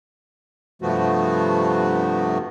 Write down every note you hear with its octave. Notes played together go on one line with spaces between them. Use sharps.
G2 C3 F3 A3 B3 F#4